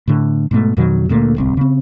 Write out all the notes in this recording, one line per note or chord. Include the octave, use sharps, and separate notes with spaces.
A2 D3
G#2 B2 A3
F2 B2 D#3 F#3
D2 A#2 A3 A#3
D1 C2 C4
C#3 C4